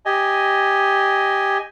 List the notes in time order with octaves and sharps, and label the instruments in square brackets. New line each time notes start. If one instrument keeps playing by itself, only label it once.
[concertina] G4 D#5 G#5